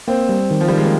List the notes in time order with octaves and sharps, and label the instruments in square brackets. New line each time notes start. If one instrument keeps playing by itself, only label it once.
[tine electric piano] A#3 [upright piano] C4
[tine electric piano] G3
D#3
[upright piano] F3
G3
[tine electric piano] D#3
[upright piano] G#3
A#3